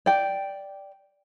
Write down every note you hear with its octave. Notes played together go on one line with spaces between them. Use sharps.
D5 G5